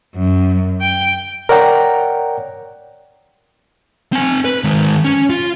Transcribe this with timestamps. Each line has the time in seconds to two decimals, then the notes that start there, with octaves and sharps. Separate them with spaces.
0.15 F#2
0.81 G5
1.49 A#4 C#5 D5 F#5 G5 A#5
4.12 C4 G#5
4.45 B4
4.64 D#3 G#3
5.05 C#4
5.30 F4